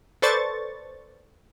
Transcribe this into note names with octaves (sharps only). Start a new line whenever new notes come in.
A4 B4 C5 D5 C#6 A6